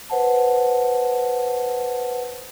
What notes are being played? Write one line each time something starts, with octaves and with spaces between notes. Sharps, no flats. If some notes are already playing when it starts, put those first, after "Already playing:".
B4 C5 F#5 A5